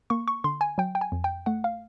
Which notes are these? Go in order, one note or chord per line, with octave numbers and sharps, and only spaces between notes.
A#3 C#6
C#6
D3 C6
G#5
F#3 G5
G5
G#5
F2
G5
A3 F#5
F5